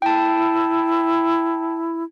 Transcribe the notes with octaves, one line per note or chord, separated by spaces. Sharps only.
E4 G5 A5